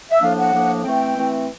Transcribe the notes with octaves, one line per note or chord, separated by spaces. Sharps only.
E5
A2 F3 A#3 D4 F5
F#5
A2 F3 A#3 D4
E3 A3 C4 G5
E3 A3 C4